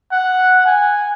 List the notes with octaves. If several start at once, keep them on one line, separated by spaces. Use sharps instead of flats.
F#5
G#5